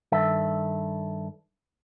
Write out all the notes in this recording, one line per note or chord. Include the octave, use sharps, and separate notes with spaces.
G2 D#3 A4 E5